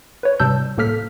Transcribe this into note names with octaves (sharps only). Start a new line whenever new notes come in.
B4 C#5
G#2 C3 G3 A5 E6 G6
A2 A#3 A4 F6 B6